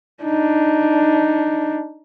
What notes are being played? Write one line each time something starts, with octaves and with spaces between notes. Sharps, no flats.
D4 D#4